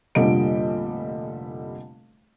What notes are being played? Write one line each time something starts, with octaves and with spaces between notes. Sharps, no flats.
F1 A#2 D3 G3 D#5 D7